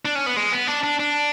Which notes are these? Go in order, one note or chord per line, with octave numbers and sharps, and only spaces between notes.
D4
C#4
B3
G#3
B3
D4
D4
D4